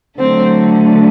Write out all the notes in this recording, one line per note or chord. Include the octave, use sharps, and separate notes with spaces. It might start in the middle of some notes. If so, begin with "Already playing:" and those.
D3 F#3 A3 C4